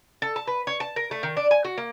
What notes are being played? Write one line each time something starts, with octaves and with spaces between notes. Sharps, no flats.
A4
A5
B4
C#5
A5
A#4
A3
D#3
D4
G#5
F#4
A#3